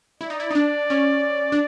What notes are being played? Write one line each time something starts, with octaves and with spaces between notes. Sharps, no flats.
E4 D5
D#4
E4
D#4
D4
C#4
D4